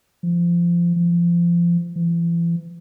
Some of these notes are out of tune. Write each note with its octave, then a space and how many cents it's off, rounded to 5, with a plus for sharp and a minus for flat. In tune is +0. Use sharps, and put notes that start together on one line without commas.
F3 -20
F3 -25
E3 +40